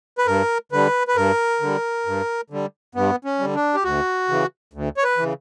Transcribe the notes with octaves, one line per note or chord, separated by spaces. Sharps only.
B4
G2 A#4
D3 G3 B4
B4
G2 A#4
D3 G3
G2
D3 G3
G2 B3
C#4
D3 G3
D4
G4
D2 F#4
C#3 E3
D2
C#5
B4
C#3 E3